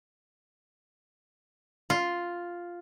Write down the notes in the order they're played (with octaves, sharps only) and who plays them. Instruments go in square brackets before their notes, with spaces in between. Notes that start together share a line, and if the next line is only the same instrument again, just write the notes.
[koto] F4